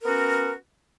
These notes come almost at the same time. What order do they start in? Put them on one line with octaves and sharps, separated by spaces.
A#4 B3 F#4 C#4